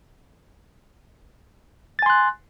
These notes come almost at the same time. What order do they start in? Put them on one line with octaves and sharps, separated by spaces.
A6 G#5 C6 F#6